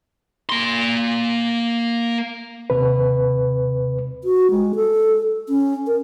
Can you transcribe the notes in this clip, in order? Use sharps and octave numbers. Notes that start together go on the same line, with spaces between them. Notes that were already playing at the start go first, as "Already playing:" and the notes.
A#3 C6
D#2 C3 B4
F#4
G#3
A4
C#4
A#4